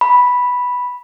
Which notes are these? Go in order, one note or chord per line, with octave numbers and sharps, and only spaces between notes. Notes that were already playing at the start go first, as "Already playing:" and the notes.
B5